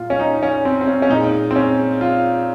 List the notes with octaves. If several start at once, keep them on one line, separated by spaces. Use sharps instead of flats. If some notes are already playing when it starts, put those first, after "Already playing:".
Already playing: A#2 G3 F4
C#4
D#4
C#4
C4
C4
C#4
C#4
A#2 G#3 D#4
C4
C#4
F4